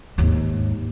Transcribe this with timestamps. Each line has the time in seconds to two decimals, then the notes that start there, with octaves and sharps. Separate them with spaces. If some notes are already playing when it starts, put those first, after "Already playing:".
0.18 D#2 G#2